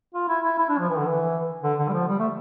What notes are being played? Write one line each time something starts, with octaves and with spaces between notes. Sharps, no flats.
F4
E4
E4
E4
D4
F3
E3
D3
E3
D3
D3
G3
F3
G3
A3